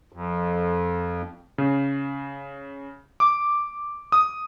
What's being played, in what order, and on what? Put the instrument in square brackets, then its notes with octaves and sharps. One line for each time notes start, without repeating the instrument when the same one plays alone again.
[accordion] F2
[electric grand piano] C#3
D6
D#6